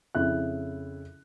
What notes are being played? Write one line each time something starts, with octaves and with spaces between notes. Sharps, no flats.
F2 C#3 E4 F#6